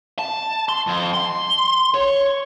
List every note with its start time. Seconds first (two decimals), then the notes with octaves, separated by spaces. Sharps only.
0.19 A5
0.69 C6
0.87 F2
1.14 C6
1.94 C#5